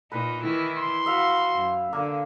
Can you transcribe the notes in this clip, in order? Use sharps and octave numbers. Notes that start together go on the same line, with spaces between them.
A#2 D#4 B4
D#3 E3 E4
C6
F#4 E5 F5
F#2
D3 A#3